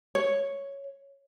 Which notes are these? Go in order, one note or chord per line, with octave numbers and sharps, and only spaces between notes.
C#5